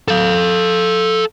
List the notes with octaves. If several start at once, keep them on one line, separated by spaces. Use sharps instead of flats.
A4 F5